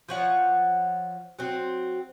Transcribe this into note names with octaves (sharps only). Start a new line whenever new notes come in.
F3 C#5 F#5
F#3 C4